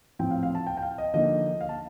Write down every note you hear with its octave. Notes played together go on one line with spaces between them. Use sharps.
A2 F3 C4 G5
F5
F5
A5
G5
G5
F5
D#5
D3 F3 A#3 D#4 D#5
F5
A5